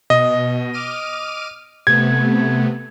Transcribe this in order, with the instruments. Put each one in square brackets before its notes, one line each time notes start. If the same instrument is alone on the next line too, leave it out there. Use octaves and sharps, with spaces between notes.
[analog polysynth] B2 [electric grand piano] D#5
[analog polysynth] D6 F6 D#7
[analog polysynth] C3 A3 B3 [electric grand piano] G#6